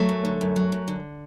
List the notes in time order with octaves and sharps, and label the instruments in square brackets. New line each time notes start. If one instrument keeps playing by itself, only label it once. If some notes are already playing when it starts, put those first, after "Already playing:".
Already playing: [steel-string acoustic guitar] F#3 A3
F#2
D3
F#2
F#3
F#2
D3